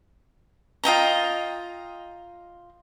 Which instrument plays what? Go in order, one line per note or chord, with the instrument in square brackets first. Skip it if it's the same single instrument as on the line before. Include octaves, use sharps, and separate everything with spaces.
[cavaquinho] F4 D#5 G5 A#5